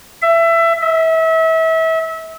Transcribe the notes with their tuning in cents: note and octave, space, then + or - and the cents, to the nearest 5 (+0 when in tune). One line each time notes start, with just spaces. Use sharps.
E5 +20
E5 -30